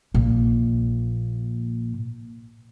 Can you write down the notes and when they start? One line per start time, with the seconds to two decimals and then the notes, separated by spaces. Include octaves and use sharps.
0.14 A#1 A#2